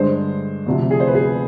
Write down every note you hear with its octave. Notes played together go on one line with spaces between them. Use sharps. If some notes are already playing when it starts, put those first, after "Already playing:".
Already playing: G2 D3 G#3 C5
D2 C3 F3
G#4
C5
B4
G#4